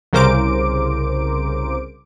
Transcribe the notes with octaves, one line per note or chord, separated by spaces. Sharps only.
C2 C#3 A#4 C5 D6 D7